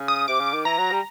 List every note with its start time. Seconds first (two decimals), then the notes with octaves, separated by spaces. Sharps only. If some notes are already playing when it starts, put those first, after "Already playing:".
Already playing: C#3
0.08 D#6
0.28 C3 D6
0.40 C#3
0.53 D#3
0.65 E3 A#5
0.78 F#3
0.91 G3